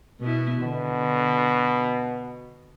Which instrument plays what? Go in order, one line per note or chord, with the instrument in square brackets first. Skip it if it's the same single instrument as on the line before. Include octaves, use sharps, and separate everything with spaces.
[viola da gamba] B2 B3 E4
[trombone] B2 [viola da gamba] D3